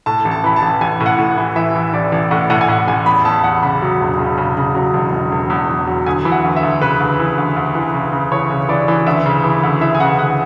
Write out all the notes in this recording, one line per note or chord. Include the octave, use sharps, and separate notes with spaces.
A2 A5
A1
A5
E3 B5
A5
A1
A1 G#5
A2
F#5
A2
F#5
E3
E3 E5
E3
A1 D5
A1
A2 F#5
A2 F#5
G#5
A2 F#5
A1 G#5
E2 B5
E2 A5
E2 F#5
C#3 B5
F#3
E1
C#3
C#3
C#3
F#3
E1
E1
E1
E2
E2
F#3
D2 G#5
E3
F#5
D2
E5
D2
C#3 B4
D2
E3
D2
D2
E3
C#3
C#3
E3 C#5
C#3
E3 D5
E3
D2 E5
C#3
E3
D2
E3 E5
G#5
C#3 F#5
D2 F#5